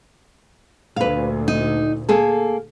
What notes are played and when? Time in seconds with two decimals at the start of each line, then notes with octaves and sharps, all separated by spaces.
0.96 D2 A#2 B4 F5
1.48 D#4
2.09 A#3 G#4 A4